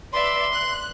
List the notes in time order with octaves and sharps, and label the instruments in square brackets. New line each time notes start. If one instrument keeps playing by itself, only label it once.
[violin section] B4 D5 E5 [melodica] C6
[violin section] F#6